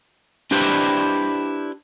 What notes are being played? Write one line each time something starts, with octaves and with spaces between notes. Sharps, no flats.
D4 E4 G4 B4 C5 D5